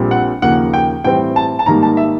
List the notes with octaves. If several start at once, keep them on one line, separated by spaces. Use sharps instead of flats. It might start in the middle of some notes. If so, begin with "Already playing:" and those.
Already playing: A#1 A#2 G3 C4
F#5
D#2 C#3 F3 A#3 F#5
G5
A2 E3 G3 C4 G5
A5
A5
G#2 D#3 G3 A#3 A#5
A5
E5